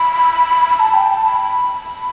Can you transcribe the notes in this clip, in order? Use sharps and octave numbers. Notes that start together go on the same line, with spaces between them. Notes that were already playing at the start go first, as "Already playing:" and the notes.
Already playing: B5
A5
G5
A5
B5
B5